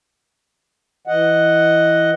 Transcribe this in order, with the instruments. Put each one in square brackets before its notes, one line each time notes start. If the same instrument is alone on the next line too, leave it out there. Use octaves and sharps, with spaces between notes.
[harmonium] E3 D#5 F#5